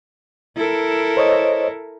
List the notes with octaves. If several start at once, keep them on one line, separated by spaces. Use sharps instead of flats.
E4 A4 A#4
C5 C#5 D#5